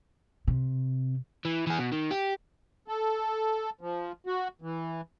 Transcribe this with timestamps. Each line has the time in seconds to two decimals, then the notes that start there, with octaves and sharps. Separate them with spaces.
0.48 C3
1.45 E3
1.67 E3 G#4
1.79 B2
1.92 D#3
2.11 G4
2.88 A4
3.81 F3
4.27 F#4
4.62 E3